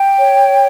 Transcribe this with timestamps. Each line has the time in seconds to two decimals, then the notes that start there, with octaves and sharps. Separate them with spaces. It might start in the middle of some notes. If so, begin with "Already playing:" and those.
Already playing: G5
0.19 C#5